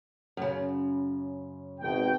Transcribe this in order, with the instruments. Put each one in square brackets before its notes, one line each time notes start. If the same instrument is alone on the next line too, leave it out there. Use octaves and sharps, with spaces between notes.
[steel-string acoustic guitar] F#2 C#3
[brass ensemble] G#1 B2 G5